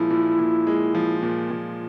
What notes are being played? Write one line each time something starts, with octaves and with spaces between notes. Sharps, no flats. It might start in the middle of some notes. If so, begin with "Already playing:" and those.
Already playing: A#2 F3 G#3 E4
A#2
A#2
G#3
F3
A#2
A#2